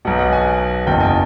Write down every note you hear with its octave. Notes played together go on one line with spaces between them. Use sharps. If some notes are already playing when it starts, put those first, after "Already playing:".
B1 B2 F#5
F#5
G#5
F#1 E2 B2 G5
G#5